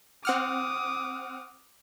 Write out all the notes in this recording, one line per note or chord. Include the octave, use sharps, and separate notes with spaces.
C4 F#5 D6 D#6 F6